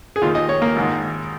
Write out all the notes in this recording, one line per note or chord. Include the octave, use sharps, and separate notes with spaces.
G#4
D#2 D#3 F4
D#5
C#5
A#3
G#1 G#2 D#3